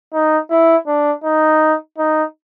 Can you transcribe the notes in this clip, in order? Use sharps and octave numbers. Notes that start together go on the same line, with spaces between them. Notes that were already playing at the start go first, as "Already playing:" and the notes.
D#4
E4
D4
D#4
D#4